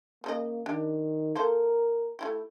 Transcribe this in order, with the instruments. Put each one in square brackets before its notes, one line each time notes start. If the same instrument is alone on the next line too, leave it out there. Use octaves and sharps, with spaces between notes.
[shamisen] C#3 D#4 D#5 [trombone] A#3
[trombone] D#3 [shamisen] D4 G4
[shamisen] A#3 A4 C5 [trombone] A#4
[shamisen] A3 E4 G4